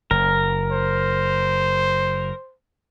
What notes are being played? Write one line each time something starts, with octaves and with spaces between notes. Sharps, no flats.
F#1 A#4
C5